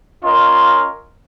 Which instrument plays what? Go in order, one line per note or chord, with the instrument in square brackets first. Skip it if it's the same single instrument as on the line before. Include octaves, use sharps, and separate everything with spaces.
[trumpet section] C#4 F4 A#4 D#5 C6